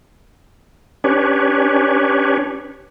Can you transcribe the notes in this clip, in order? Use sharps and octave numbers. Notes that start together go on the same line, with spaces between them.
C#4 D4 G4 B4 C#5